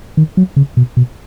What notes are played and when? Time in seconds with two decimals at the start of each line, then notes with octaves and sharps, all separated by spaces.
0.17 D#3
0.37 F#3
0.56 C#3
0.77 B2
0.97 B2